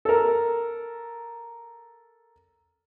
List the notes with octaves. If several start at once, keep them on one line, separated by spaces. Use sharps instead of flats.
A4 A#4